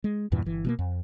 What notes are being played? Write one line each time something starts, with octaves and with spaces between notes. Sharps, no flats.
G#3
E2 G2 A#2 E3
G1 E3
B2 G#3 A#3
F2